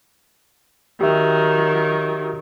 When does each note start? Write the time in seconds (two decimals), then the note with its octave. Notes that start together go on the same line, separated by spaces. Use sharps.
1.01 D#3 F#3 G4 E5